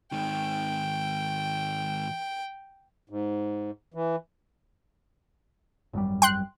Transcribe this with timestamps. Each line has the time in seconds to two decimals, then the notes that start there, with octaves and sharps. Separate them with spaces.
0.12 G#2 D#3 G5
3.09 G#2
3.94 E3
5.93 G#1 F#2 G3
6.22 G5 C6 F#6